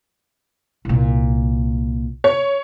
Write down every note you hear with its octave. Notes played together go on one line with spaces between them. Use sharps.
C2 A#2
C#5